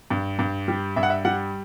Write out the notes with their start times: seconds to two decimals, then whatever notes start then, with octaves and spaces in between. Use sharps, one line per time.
0.10 G2
0.39 G2
0.68 G3
0.96 G2 E5
1.03 F#5
1.10 E5
1.25 G3 F#5